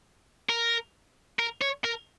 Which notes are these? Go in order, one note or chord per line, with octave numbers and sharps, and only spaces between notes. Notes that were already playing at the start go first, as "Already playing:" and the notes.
A#4
A#4
C#5
A#4